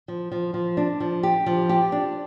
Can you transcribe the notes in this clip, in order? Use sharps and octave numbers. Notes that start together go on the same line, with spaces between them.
F3
F3
F3
D4
F3
G4
F3
G4
D4